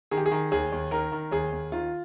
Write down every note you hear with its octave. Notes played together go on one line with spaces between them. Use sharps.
D#3 G#4
G4
G#4
D#3
D#2 G#4
D#2
D#3 A#4
D#3
D#2 G#4
D#2
D#3 F4